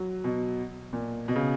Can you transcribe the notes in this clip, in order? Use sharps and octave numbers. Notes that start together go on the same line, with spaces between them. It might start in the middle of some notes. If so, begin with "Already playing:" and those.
Already playing: F#3
B2
A#2
B2
C#3